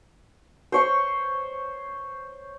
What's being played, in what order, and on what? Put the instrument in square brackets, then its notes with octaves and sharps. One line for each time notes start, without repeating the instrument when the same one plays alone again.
[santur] C5 C#5 C#6